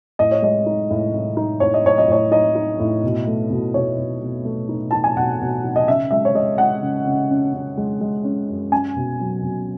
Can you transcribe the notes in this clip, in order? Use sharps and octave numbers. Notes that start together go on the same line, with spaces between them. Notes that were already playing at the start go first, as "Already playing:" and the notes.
A2 D#5
C#5
G#3 D#5
D#4
A2
A2
D#4
A2 C#5
D#5
A2 C#5
D#5
A2 C#5
D#4 D#5
D#4
A2
B2
A3
B2
B2 C#5
B2
B2
A3
D#4
D#4 A5
G#5
B2 F#5
B2
D#4
D#5
C#3 E5
G#3 E5
C#5
G#3 D#5
G#3 F#5
C#3
C#3
C#4
C#4
G#3
G#3
C#4
F#2
C#4 G#5
B2
F#3
B2